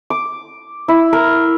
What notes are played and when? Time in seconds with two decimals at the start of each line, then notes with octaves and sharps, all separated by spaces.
0.10 D6
0.88 E4
1.13 A#4